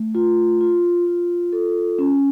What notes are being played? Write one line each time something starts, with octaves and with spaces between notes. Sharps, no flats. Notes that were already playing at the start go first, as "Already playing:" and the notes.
Already playing: A3
F4
F4
F4
A4
C#4